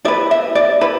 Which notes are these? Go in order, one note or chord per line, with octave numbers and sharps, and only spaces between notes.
E4 B4 D5
E5
D5
E4 B4